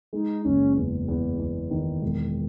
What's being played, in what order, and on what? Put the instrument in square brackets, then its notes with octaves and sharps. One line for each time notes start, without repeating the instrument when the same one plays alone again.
[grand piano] G#3 [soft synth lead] D#4
[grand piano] F#1 [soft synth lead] C#4
[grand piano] E2
E2
E2
D#3
E1